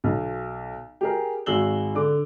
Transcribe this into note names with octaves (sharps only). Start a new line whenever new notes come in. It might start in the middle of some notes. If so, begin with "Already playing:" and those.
B1
G4 G#4 A#4
G#1 F#4 G#4 E6 F#7 G7
D3 D6